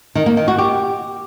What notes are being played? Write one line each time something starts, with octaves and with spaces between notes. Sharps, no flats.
D#3
A#3
D#3
F#4
G4